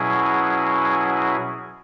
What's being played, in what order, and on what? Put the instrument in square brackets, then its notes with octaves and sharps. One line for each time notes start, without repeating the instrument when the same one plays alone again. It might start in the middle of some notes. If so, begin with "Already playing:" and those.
Already playing: [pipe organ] B2 F#3 C#4 E4 G#4